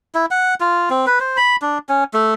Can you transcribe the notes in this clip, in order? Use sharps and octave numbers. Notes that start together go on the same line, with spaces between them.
E4
F#5
F4
C4
B4
C5
B5
D4
C#4
A3